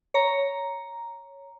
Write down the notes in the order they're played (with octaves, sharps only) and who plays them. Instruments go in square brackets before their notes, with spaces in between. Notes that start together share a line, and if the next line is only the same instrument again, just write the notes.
[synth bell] C#5 A#5